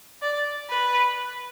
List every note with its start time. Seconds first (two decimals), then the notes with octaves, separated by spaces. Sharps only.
0.22 D5
0.69 B4